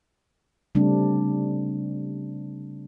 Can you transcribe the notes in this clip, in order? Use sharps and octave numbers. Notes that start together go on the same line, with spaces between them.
C#3 G3 A3 C4 D4